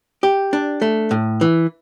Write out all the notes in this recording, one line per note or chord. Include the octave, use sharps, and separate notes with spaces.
G4
D4
A3
A2
E3